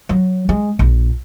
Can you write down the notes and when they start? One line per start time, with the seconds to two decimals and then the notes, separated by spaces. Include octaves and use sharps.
0.09 F#3
0.49 G#3
0.79 A#1